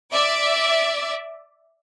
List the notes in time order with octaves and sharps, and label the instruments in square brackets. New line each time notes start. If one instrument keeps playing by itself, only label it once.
[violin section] D5 E5